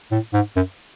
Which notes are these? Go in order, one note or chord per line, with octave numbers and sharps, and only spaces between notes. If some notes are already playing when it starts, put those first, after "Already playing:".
A2
G#2
F#2